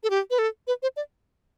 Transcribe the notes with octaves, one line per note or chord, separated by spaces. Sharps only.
A4
G4
B4
A4
B4
C5
D5